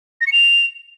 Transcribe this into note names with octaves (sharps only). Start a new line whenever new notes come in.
A#6
C#7
F7